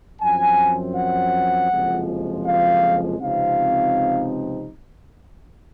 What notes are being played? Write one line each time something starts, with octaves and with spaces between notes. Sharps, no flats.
F#2 F3 C4 G#5
F#5
F#1 F2 C3 F3 G#3
F5
C#2 C3 F3 C4 D#4 F5